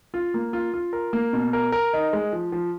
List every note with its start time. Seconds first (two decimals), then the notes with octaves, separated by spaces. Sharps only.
0.14 F4
0.34 A#3
0.53 F4
0.74 F4
0.93 A#4
1.13 A#3
1.33 B2
1.53 A#4
1.72 A#4
1.93 D#4
2.13 G#3
2.33 F3
2.52 F3